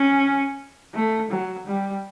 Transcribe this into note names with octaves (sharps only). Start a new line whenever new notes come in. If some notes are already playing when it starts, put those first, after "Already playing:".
Already playing: C#4
A3
F#3
G3